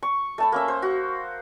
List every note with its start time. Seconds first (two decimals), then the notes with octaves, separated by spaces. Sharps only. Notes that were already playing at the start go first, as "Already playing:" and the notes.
0.03 C#6
0.38 A3 A5 B5
0.52 A#3 C#4 E5
0.68 C5
0.82 F#4